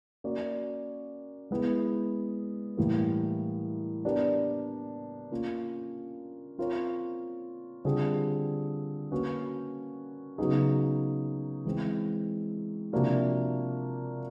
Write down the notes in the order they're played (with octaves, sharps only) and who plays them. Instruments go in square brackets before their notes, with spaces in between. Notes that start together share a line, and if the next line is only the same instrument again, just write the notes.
[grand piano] A#3 C#4 F#4 A#4 D5
G#3 B3 E4 G#4
A2 E3 G3 A#3
B3 D4 G4 A#4 D5
A#3 C#4 F4
C4 F4 A#4 C#5
D3 G3 C4 F4 G#4
A#3 C#4 F#4 B4
C#3 F#3 B3 D#4 G#4
E3 G#3 C4
C3 F3 A#3 D4 F#4